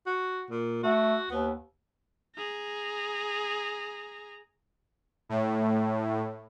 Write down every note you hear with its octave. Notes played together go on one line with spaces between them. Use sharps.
F#4
A#2
A3 F#4
D#2 B3
G#4 A#5
A2